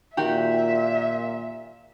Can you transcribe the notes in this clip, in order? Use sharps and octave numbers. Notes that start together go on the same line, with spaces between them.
A#2 D#3 F#4 G4 E5